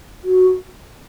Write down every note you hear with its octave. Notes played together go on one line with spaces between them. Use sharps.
F#4